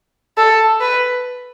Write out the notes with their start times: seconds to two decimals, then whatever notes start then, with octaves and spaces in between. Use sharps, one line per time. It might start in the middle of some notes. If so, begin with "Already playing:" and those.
0.37 A4
0.81 B4